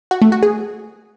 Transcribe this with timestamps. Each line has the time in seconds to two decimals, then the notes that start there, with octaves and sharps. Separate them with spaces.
0.11 F#4
0.22 A3
0.32 F#4
0.43 G#4